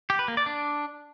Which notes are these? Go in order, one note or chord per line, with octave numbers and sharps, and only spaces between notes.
G4
B4
A#3
D5
D4